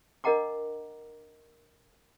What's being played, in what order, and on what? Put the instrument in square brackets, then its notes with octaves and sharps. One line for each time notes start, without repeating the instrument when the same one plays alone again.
[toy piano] D4 A#4 D#5 F#5 A#5 D6